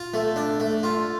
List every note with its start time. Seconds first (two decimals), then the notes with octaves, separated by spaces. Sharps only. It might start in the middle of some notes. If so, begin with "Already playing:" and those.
Already playing: F4
0.14 A3
0.36 D4
0.60 A3
0.83 F4